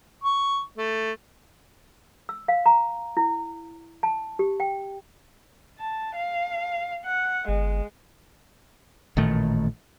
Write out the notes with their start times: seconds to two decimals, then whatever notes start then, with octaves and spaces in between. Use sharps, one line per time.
0.24 C#6
0.77 A3
2.29 E6
2.48 F5
2.66 A#5
3.17 E4
4.03 A5
4.39 G4
4.60 G5
5.79 A5
6.16 F5
7.05 F#5
7.48 G1 G#3
9.17 A1 A#2 D#3 A3